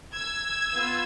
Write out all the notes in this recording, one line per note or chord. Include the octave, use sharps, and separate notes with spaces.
E6 G#6
B3 F4